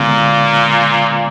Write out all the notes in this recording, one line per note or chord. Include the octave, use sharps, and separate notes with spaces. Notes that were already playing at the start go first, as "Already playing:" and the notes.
Already playing: A#2 D3 G#3 B3